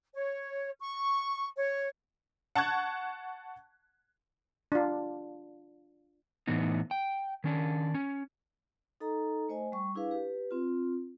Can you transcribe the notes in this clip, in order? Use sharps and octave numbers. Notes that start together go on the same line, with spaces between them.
C#5
C#6
C#5
F#5 A5 C#6 F#6 G#6
D4 F4
A2 E3 B3 D#4
G5
D#3 C#4 D4
C#4
D#4 A4 D#5 A#5
A3 C5 D#5 G#5
G3 C#6
D4 E4 G#4 B4 F5
G4 B4
C4 F4